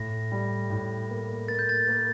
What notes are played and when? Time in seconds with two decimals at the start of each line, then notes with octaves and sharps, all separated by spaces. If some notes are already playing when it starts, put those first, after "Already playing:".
Already playing: A2 A#6
0.31 G3
0.70 A2
1.09 A#3
1.48 A#3 A6
1.59 G6
1.69 A6
1.88 A#3